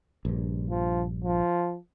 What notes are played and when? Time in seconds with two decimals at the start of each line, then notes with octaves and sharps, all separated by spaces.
0.25 A#1 G2
0.70 F3
1.24 F3